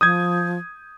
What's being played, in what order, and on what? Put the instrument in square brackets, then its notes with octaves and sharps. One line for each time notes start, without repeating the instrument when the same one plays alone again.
[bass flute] F3 [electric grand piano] D#6 G6 G#6